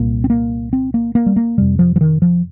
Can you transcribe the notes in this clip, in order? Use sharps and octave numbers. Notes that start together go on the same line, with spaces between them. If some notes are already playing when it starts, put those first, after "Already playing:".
Already playing: C2 A#2 A#3
C4
A#3
C4
A#3
A#3
G3
A#3
F2 C3 G3
F3
F3
D#3
F3